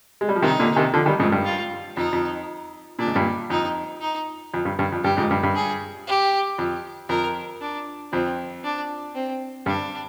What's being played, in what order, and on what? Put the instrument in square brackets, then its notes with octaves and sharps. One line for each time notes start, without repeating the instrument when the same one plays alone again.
[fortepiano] G#3
G3
F3
[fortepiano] C3 D#3 [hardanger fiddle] D#4
[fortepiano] A#2 D3
C3 D#3
D3 F3
D#3 G3
F2 G#2
G2
[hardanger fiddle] F4
[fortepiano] F2 [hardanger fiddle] D#4
[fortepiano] F2
[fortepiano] A#2 [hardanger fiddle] D4
[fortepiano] G#2
G2 A#2
[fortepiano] F2 [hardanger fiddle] D#4
[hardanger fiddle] D#4
[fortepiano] F2
G2
G2
F2
[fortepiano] G2 [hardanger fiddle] G4
[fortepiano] F2 G#2
G2
G2
[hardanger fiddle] G#4
G4
[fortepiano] F2
[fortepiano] F2 [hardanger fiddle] A#4
[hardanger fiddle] D4
[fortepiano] F2 [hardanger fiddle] C4
[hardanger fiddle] D4
C4
[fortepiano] G2 [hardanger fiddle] D4